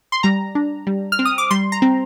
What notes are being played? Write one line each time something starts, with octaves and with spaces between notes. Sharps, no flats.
C6
G3 A#5
D4
G3
F6
C4
D#6
D6
G3 C6
A#5
C4